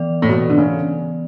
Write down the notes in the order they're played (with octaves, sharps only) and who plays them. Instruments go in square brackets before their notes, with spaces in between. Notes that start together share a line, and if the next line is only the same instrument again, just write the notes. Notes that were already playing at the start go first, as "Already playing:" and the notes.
Already playing: [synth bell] E3 B3 D5
[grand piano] A2
B2
D3
C#3